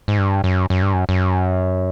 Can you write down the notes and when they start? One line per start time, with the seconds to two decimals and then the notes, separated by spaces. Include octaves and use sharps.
0.08 G#2
0.18 G2
0.44 F#2
0.70 F#2
0.82 G2
0.93 F#2
1.09 F#2